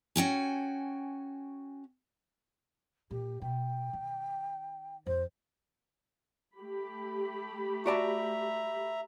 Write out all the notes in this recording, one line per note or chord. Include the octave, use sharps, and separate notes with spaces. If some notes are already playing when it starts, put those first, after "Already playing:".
C#4 F#4 G5 G#5
A#2 G4
B2 G5
D#3
F2 C5
A3 G4 B5
F#4 D5 E5 A5 A#5